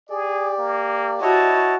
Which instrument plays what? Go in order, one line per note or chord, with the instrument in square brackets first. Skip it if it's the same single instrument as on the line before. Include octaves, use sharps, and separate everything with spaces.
[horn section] G4 D5 [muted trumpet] G#4
[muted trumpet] A#3
[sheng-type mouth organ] E4 C#5 D#5 [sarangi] F#4 [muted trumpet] A5